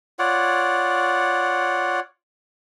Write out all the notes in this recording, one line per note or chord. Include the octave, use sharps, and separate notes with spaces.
F4 C#5 D5 F#5